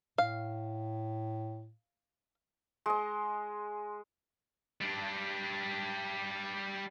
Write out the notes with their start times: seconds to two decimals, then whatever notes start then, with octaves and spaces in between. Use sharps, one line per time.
0.18 A2 F5
2.86 G#3 D#5
4.81 G3 D4